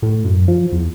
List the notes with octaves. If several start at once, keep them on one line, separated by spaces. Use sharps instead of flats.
A2
F#2
F3
E2